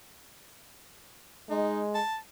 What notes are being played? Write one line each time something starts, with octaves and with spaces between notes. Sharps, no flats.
G#3 D#4
A5